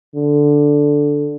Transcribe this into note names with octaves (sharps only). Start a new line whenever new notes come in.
D3